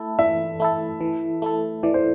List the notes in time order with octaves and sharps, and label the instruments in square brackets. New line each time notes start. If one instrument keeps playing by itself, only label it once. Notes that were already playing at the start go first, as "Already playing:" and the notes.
Already playing: [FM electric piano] A3 E4 A4
[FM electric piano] E3 [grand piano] E5
[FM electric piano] A3 E4 A4
E3
A3 E4 A4
[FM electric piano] E3 [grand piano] D5
[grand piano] C5